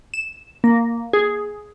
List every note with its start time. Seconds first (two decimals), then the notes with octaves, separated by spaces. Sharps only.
0.14 E7
0.64 A#3
1.13 G#4